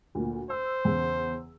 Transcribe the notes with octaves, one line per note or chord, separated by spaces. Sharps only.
D2 A#2
C5 E6
E2 C#3